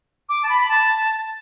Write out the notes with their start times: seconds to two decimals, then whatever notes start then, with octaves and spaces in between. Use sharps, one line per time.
0.29 D6
0.43 A5
0.49 B5
0.69 A5